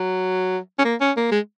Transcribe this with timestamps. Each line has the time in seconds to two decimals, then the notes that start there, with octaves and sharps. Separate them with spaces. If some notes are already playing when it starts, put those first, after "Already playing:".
Already playing: F#3
0.79 C#4
0.84 A#3
1.01 C#4
1.17 A#3
1.31 G#3